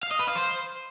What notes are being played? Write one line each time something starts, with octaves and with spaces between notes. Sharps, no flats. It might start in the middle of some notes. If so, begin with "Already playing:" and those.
F5
D#5
B4
F5
C5